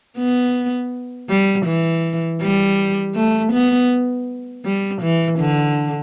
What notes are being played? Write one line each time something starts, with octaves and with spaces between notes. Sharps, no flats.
B3
G3
E3
G3
A3
B3
G3
E3
D3